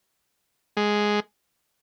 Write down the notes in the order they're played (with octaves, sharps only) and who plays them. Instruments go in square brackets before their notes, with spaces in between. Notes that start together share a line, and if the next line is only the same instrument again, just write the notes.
[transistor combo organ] G#3